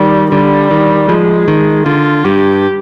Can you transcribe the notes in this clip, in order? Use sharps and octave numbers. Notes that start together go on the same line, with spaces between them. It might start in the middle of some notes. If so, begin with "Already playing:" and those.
Already playing: D#3 G3
D3 G3
D#3
F3 G#3
D#3
D3 F4
G2 G4